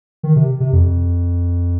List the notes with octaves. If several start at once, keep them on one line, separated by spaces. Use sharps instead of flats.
D#3
C3
C3
F2